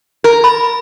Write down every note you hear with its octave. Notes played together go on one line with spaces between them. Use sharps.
A#4
B5